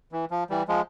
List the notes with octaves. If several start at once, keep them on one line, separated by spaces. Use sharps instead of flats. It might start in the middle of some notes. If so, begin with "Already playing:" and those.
E3
F3
E3 G3
F3 G#3